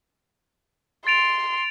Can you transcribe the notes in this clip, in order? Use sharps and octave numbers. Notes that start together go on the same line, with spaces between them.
C6 A6 D7 F7